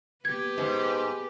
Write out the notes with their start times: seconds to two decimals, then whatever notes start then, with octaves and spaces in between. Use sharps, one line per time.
0.25 B3 G4 B4 G#6
0.58 G#2